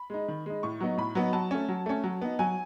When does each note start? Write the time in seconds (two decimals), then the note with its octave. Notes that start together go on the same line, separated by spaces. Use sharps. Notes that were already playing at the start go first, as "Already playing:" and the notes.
Already playing: B5
0.10 G#3 D#4
0.28 D#3
0.46 G#3 D#4
0.63 A2 C#6
0.80 F#3 B3 D#4
0.98 A2 B5
1.15 F#3 B3 D#4
1.33 F#3 A5
1.51 A3 C#4
1.68 F#3
1.86 A3 C#4
2.04 F#3
2.21 B3 D#4
2.39 F#3 G#5